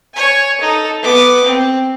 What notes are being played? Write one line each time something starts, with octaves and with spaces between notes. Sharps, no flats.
C#5 G#5
D#4 A4
B3 D6
C4